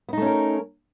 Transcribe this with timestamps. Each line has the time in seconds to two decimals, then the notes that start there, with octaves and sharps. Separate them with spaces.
0.09 B3
0.13 D#4
0.17 A3
0.22 C#4
0.26 A#4